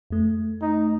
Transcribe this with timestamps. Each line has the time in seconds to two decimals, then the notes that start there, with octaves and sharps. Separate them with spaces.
0.10 F2 A3
0.62 D#4